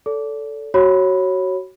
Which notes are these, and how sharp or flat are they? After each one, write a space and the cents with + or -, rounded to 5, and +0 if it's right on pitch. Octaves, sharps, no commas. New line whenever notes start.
A4 +0 D5 -40
F#4 +20 C#5 -15 B5 +0